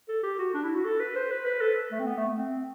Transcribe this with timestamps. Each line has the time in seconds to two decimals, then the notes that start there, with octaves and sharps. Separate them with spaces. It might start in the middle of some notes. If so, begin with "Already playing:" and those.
0.08 A4
0.23 G4
0.39 F#4
0.54 D4
0.64 E4
0.74 F#4
0.85 A4
1.00 B4
1.16 C5
1.31 B4
1.46 B4
1.61 A4
1.92 A3
2.00 C4
2.07 B3
2.17 A3
2.37 C4